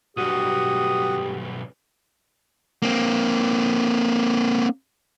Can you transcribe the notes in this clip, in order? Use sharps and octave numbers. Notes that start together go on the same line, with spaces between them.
B1 G2 F#4 G4 D#6
A#3 C4